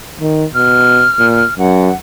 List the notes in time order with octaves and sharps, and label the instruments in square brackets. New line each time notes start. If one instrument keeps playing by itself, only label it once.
[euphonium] D#3
[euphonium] B2 [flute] F6
[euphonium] A#2
[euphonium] F#2 [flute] F#5